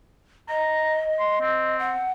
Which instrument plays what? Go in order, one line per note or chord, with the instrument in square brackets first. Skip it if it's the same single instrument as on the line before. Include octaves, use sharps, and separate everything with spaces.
[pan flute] D#5 [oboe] A#5
[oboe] C6
C4
[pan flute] F#5